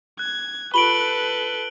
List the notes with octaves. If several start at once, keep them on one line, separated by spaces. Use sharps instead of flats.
F#6 G#6
F4 G4 A4 B4 B5 D7 F#7 G7